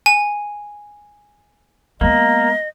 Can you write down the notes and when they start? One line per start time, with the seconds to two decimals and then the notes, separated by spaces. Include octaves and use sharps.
0.06 G#5
2.01 G#3 A#3 B3 D#5